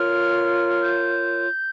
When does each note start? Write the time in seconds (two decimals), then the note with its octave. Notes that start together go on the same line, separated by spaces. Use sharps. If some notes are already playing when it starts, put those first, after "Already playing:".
Already playing: F4 A#4 C#5 F6
0.82 G6